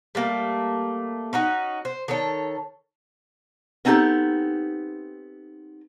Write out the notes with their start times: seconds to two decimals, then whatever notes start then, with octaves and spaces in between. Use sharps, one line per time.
0.15 G3 A3 A#3
1.33 C#4 D#4 F#4
1.85 C5
2.08 D#3 A4 C#5
3.85 B3 C4 D#4 F4 G4 A4